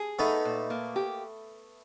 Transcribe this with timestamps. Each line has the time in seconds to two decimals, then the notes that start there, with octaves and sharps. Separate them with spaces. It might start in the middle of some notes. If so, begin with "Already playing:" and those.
Already playing: G#4
0.19 A3 B3 D#4
0.45 A#2
0.70 A#3
0.96 G4